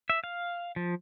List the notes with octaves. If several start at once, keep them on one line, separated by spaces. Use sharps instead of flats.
E5
F5
F3